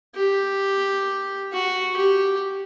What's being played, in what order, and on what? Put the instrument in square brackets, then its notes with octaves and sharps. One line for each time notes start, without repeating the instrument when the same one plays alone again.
[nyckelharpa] G4
F#4
G4